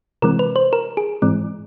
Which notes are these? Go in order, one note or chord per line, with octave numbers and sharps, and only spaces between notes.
C3 E3 G#3 C4 A#4
B4
C5
A#4
G#4
G#2 E3 G#3 C4